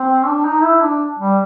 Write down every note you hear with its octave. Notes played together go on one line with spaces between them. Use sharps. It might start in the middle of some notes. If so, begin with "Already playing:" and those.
Already playing: C4
D4
D#4
E4
D4
G3